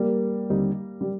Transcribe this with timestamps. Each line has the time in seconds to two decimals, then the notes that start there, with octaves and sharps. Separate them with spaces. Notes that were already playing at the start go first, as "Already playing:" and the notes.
Already playing: G3 A#3
0.50 D#2 D3 G3 C4 D#4
1.01 G3